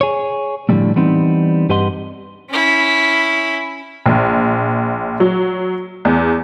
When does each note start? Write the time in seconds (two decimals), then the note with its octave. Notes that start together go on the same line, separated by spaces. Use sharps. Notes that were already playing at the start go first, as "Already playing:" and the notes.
0.01 G#4 C#5
0.69 A2 D3 F3 G3 A3
0.96 E3 G3 B3 C4 D#4
1.69 G2 G4 B4 D#5 F#5 C6
2.50 C#4 E4
4.06 A#1
5.20 F#3
6.05 E2